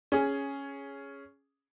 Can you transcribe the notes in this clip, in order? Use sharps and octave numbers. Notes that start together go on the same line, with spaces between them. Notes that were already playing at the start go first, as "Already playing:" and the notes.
C#4 G#4